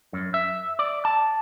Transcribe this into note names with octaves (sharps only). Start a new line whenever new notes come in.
F#2
E5
D5
A5